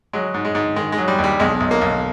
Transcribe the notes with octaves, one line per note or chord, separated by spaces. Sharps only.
F#3 G#3
G#2
G#3
G#2
D#3 G#3
G#3
F#3
G3
D#2
G3
B1 G#3
B1
A#3
B1